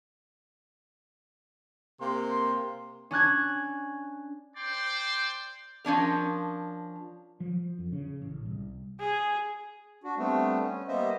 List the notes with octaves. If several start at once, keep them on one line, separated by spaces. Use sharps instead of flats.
C3 A#3 C6
C#4 D4 F#6 G#6
C5 D5 G5 C6
F3 C#4 D4 A#4
F3
F2
C#3
A1
C2
G#4
D4 F#4
G3 A3 B3 C4 D4
C#4
G3 A#3 B3 C5 D#5 E5